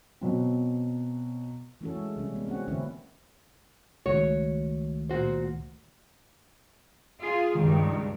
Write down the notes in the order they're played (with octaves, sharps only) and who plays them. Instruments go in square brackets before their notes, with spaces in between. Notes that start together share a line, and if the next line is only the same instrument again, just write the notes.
[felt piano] B2 F#3 C4
[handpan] E3 A3 C#4 F#4 A4
G#3
C3 G3 C#4
G#3 A#3 B3
C4 C#4 F#4 F#5
D3 E3 A#3 C4 C#4 E4
[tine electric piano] C#2 D#3 A3 [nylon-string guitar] F#4 C#5
[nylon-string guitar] A#2 F#4 C5
[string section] F4 G#4
[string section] C#2 G2 [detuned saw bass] D#3